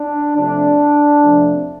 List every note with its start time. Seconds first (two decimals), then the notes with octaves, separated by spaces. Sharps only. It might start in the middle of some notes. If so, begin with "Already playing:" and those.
Already playing: D4
0.35 C3 F3 A3 D4
1.21 F2 C3 F3 A3